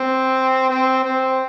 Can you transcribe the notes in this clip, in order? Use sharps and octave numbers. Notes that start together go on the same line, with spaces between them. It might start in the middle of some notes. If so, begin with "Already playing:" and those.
Already playing: C4
C4
C4